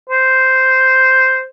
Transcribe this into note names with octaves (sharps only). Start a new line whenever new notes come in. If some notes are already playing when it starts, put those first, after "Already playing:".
C5